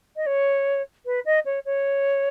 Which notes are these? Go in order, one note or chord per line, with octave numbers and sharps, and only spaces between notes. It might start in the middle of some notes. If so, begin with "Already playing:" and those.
D#5
C#5
B4
D#5
C#5
C#5